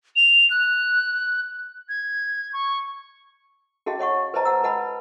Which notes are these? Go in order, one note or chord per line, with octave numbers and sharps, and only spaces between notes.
F7
F#6
G#6
C#6
C#4 F#4 G#4 D#5 F5 A5
C#5 D#5 F#5 C#6
B4 C5 D5 D#5 A5 A#5
F#5 A#5 E6
B4 D#5 F#5 A5 B5